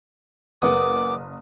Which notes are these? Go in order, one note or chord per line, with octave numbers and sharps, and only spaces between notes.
F#1 A#2 E3 B3 D6 D#6